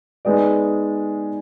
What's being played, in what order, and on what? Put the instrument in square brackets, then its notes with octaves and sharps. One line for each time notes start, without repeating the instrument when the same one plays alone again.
[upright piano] G#3 B3 D#4 G#4 D5